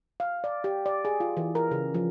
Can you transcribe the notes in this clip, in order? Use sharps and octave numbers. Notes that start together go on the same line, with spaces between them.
F5
D5
G4
D5
G#4
F4
E3
A#4
C#3
F3